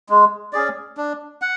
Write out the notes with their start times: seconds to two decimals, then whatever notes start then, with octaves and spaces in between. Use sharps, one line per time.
0.09 G#3
0.53 C#4 G#4 D5
0.97 D4
1.42 F#5